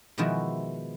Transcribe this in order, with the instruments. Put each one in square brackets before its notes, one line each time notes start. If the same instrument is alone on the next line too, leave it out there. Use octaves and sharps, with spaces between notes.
[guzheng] B2 D#3 F3 G#3 E4 F#4